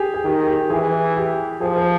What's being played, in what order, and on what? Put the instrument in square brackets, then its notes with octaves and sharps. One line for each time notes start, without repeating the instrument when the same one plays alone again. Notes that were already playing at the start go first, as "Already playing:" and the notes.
Already playing: [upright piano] G4 G#4
G#4
[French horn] D#3 [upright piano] G4
[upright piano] G4
[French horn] E3 [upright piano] G#4
[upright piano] G4
[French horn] F3 [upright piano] G#4
[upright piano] C5